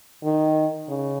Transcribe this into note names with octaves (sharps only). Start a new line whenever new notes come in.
D#3
C#3